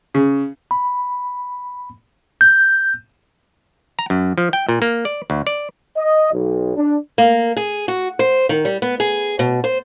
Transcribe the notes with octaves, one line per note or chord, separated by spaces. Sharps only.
C#3
B5
G6
A#5
F#2
F3
G5
A#2
A#3
D5
D2
D5
D#5
B1
D4
A#3
G#4
F#4
C5
D#3
G3
B3
G#4
B2
C5